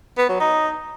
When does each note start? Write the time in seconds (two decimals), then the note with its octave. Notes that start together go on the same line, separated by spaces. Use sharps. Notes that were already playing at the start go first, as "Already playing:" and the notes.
0.18 B3
0.29 F#3
0.40 D#4